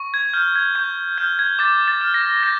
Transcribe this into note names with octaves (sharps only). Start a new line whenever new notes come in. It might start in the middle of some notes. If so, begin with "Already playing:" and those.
Already playing: C#6
G#6
F6 G6
G#6
C#6 G6
F6 G6
G#6
D6 A6
A6
F6
A#6
G6 A#6